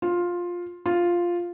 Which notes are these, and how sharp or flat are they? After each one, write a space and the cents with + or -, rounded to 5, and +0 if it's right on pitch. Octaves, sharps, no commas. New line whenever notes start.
F4 +10
F4 +0